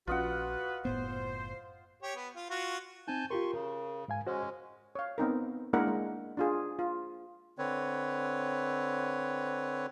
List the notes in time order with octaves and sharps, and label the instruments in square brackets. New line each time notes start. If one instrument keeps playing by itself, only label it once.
[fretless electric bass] A#1 C#4 [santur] F4 D#5 F#5 [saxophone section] F#4 B4
[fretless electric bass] F#1 A2 B3 [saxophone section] C5
[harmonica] G4 C#5
B3
F4
F4 F#4
[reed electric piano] C4 D#4 [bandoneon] G#5 A5 G6
[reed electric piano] F4 G4 A#4 [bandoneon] C6 C#6
[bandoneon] C#3 [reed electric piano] A#4
[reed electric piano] G#2 F5 G#5
[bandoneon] G#3 C#4 [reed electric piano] F#4 C5 D#5
[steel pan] C#5 F5
B3 C4 D#4 A#4
G#3 A#3 D4 E4 A#4 F#5
G#3
D4 F4 G#4
F4
[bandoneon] D3 C4 B4 C#5